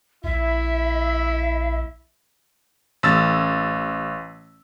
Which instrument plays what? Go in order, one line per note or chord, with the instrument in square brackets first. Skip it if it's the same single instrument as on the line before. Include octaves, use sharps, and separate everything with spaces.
[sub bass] A#1 [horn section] E4 [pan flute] E5
[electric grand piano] A1 E6 A6